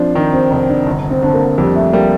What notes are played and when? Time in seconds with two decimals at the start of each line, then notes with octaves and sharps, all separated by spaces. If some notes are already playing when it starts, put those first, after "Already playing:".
Already playing: F3 C4 D4
0.15 D#3 D#4
0.33 C4
0.51 F1 C4
0.68 D4
0.86 G1
1.10 C4
1.22 D3 C4
1.34 A#3
1.58 F2 G3
1.75 A3
1.93 G3 A#3